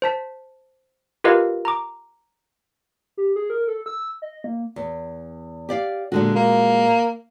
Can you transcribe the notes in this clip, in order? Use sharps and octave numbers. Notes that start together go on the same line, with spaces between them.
C5 A5 B6
F4 G4 A#4 B4 D#5 F5
A#5 D6
G4
G#4
A#4
A4
E6
D#5
A#3
E2
G4 D5 F5
A#2 D3 G#3 F#4
A#3